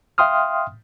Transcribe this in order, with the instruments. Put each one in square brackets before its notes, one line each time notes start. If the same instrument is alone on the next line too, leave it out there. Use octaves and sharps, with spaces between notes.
[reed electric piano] E5 F5 G5 C6 D#6 F6